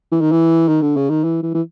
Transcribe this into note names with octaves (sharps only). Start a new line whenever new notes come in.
E3
D#3
E3
D#3
D3
C#3
D#3
E3
E3
E3